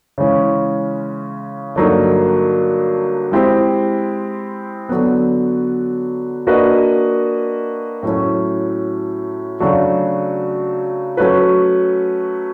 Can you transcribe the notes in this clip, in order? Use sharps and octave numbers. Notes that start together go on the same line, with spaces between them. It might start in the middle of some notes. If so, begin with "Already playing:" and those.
C#3 E3 G#3 C#4
G2 D3 F#3 A#3 D#4
G#3 C4 E4 G4 C5
D3 F#3 B3
A#3 D4 F#4 B4 D#5
A2 F#3 A3 C#4
C#3 F#3 A3 D4 F#4
F#3 A3 C#4 F#4 B4